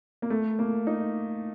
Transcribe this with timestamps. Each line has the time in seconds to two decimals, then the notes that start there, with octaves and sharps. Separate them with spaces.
0.22 A#3
0.30 A3
0.59 A#3
0.87 D#4